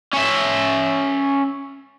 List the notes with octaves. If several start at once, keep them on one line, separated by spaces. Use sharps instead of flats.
C#4 E5